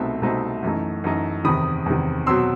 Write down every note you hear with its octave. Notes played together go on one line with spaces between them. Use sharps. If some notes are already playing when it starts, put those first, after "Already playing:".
Already playing: C2 B2 A3 C4 D#4 E5
C2 B2 A3 C4 D#4
F#2 E3 A3 D#4
F#2 E3 A3 D#4
E2 C3 D#3 B5 D#6
E2 C3 D#3
B2 F#3 C4 C6 E6